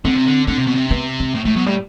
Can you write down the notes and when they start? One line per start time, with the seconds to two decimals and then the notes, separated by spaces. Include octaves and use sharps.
0.05 D3 C4
0.15 C3
0.25 D3
0.47 D3 C4
0.58 C3
0.67 B2
0.75 C3
0.90 B3
1.20 C4
1.35 A2
1.45 A2 A3
1.55 B2 F#3
1.66 A2 G3